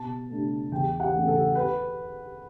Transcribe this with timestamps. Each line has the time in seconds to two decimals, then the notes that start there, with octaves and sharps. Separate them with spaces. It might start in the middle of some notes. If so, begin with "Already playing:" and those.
Already playing: B2 A5
0.30 A3 D4
0.71 E2 G5
1.00 F#5
1.13 C#3 E3 A3 C#4
1.28 A4
1.55 B4